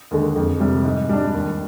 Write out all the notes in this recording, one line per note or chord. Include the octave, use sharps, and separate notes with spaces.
D#2 D3 G#3
F2
C3 G3
G#2
G3 D4
D#2